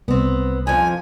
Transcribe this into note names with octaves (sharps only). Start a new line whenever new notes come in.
C2 B3 C4
F2 F3 G#5